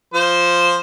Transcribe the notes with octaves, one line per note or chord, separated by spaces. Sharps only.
F3 C5